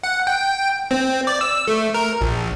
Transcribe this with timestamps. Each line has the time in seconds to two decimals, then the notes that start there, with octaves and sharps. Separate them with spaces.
0.03 F#5
0.27 G5
0.91 C4
1.27 D5
1.41 E6
1.68 A3
1.94 A#4
2.21 A#1